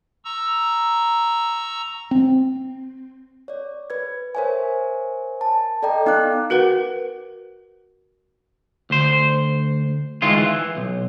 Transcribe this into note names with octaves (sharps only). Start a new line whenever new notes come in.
A#5 C#6 E6
C4
C#5 D5
B4 G#6
A#4 C5 C#5 E5 G#5
A5
A4 D5 D#5 G5 A#5
B3 D#4 F5 D6 F#6
F#4 A#4 B4 F#5
D2 C5
D#3 E3 G#3 F4
E3
B1